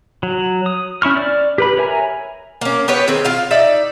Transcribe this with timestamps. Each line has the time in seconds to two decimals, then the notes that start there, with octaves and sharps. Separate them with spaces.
0.23 F#3
0.66 D#6
1.02 C#4 E4 C#6 F6
1.16 D5 F6
1.58 G4 B4 B5
1.77 A#4 C#5 E5 G#5 A#5
2.61 A#3 C#4
2.88 B3 G4 B4 C#5
3.08 D#3 C4 G#4
3.25 F4 F5
3.51 D#4 D5 E5